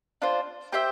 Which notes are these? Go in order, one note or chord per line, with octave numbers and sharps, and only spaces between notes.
D4 F4 C5
G4 C5 E5 G5